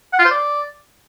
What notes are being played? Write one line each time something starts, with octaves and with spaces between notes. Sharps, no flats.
F#5
F4
C5
D5